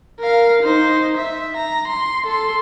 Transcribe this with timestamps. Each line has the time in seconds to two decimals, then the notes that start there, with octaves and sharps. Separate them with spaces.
0.20 A#4 F5
0.63 D#4 C5
1.17 E5
1.56 A#5
1.88 C6
2.26 A4 C6